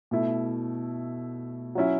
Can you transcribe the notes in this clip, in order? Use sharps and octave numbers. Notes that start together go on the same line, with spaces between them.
B2 A3 E4
F#3 C#4 E4